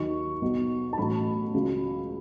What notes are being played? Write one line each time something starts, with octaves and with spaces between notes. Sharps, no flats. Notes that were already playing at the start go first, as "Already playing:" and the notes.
Already playing: D#2 D#3 F#3 C#6
B1 B2 F#3
A5
A1 A2 F#3 B5
C#2 C#3 F#3